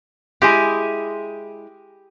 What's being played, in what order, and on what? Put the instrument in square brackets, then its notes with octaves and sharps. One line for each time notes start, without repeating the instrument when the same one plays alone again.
[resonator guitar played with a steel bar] G#3 E4 G#4 [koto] G4